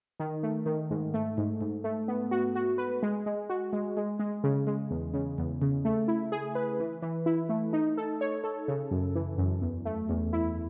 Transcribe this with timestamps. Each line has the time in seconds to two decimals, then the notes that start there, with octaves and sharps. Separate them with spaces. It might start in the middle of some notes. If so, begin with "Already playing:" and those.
0.20 D#3
0.43 A3
0.66 D#3
0.91 G#2
1.14 A3
1.38 G#2
1.61 G#2
1.84 A3
2.08 B3
2.31 F#4
2.55 F#4
2.78 B4
3.03 G#3
3.26 G#3
3.50 F#4
3.73 G#3
3.97 G#3
4.19 G#3
4.44 C#3
4.67 G#3
4.90 E2
5.14 C#3
5.38 E2
5.62 C#3
5.85 A3
6.08 E4
6.32 G#4
6.55 B4
6.80 E3
7.02 E3
7.26 E4
7.49 A3
7.73 D#4
7.97 A4
8.21 C#5
8.44 A4
8.68 C#3
8.91 F#2
9.15 E3
9.38 F#2
9.62 E2
9.85 A3
10.09 E2
10.33 E4